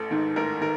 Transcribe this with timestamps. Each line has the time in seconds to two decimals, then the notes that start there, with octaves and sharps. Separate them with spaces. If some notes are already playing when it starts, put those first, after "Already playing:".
Already playing: A1 A4
0.11 G#2 D#3
0.36 A1 A#4
0.61 D#3 A#4